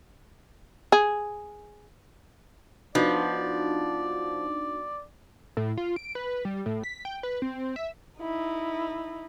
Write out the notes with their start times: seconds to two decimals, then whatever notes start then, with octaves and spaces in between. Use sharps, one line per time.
0.92 G#4
2.95 F3 B3 D4 D#4 F#4 D5
5.57 A2
5.78 F4
5.96 D7
6.15 B4
6.45 G3
6.66 A2
6.84 B6
7.05 G5
7.23 B4
7.42 C4
7.76 E5
8.20 D#4 E4